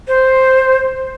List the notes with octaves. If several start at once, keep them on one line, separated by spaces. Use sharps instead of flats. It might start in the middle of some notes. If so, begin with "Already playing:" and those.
C5